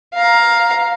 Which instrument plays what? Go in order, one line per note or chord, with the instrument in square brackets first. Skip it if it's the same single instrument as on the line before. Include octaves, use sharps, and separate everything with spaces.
[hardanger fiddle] F5 A#5